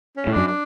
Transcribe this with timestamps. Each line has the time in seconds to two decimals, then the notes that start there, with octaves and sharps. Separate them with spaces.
0.17 C#4
0.27 A2
0.32 F#2 D4
0.47 D4